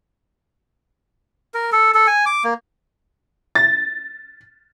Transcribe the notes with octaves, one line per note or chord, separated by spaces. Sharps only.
A#4
A4
A4
G#5
D6
A#3
A6